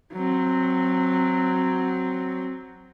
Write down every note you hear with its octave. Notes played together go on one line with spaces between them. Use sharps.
F#3 C4